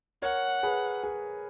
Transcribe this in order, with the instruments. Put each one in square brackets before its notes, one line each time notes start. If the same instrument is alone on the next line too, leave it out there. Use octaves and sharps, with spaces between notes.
[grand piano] A#4 C#5 [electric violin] F#5
[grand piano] G#4 B4
G#4